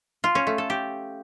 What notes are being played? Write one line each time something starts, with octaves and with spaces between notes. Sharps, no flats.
F4
C#4
A3
A4
G4